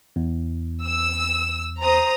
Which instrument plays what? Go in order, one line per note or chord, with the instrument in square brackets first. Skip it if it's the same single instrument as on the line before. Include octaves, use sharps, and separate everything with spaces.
[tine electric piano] E2
[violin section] E6
C5 A#5 D#6